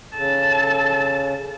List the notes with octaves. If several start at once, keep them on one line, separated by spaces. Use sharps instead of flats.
C#3 A4 A5